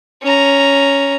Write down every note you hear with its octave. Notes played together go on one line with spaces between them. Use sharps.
C#4 A#5